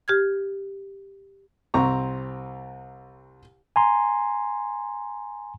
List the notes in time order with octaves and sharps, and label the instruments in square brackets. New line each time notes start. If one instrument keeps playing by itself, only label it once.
[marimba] G4 F6 G#6
[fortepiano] C2 C4 A#5 C#6
[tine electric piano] G#5 A#5 C6